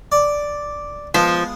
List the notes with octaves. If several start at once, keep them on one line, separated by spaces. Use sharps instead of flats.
D5
F3 G#3 B3 F4